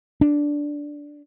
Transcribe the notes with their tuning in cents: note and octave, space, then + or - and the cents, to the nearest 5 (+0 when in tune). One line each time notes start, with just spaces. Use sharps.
D4 -5